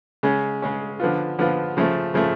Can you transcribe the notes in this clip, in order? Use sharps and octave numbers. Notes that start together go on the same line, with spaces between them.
C#3 G#3 C#4
C#3 G#3 C#4
D3 F3 B3 F4
D3 F3 B3 F4
C#3 F3 A3
C#3 F3 A3